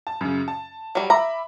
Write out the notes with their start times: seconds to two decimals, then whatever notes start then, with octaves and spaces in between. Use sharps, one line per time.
0.07 A5
0.21 F#2 C#3
0.48 A5
0.95 F#3 G3
1.10 E5 A#5 B5 D6